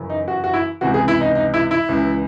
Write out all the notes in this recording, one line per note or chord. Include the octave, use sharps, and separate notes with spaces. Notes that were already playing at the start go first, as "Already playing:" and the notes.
Already playing: F#2 C#3 E3
D#4
F#4
F#4
E4
C#2 C3 E3 F#4
G#4
E4
D#4
D#4
E4
E4
C#2 C#3 E3